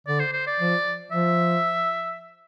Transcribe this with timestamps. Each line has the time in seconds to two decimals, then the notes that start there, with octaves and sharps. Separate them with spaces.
0.07 D3 D5
0.20 C5
0.33 C5
0.47 D5
0.60 F3
1.12 F3 E5